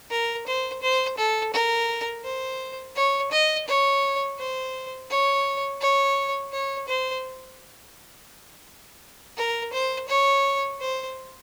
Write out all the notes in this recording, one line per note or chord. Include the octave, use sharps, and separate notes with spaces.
A#4
C5
C5
A4
A#4
C5
C#5
D#5
C#5
C5
C#5
C#5
C#5
C5
A#4
C5
C#5
C5